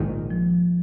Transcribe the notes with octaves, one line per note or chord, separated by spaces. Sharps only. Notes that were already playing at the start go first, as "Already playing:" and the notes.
Already playing: A#1 G#2 D#3
F3